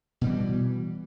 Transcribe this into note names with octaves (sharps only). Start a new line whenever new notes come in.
B2 E3 G3